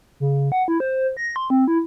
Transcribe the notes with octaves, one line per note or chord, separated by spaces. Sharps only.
C#3
F#5
E4
C5
A#6
C6
C4
E4